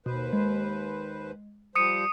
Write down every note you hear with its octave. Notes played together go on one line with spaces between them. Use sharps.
D#2 B2 B4 C5
G#3
F3 G3 C5 D#6 C#7 D#7